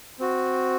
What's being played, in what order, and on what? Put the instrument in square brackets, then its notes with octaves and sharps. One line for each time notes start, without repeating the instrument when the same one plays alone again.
[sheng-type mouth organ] C4 F#4